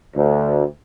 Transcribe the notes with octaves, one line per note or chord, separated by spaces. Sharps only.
D2